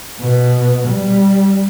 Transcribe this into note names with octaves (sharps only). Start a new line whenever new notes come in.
B2
G3